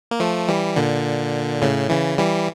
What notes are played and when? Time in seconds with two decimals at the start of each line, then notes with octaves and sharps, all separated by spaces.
0.11 A#3
0.20 F3 A3
0.49 E3 G3
0.76 A#2 D3
1.62 A2 C#3
1.90 C#3 E3
2.18 E3 G3